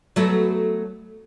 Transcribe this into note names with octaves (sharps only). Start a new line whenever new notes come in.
F#3 A3 B3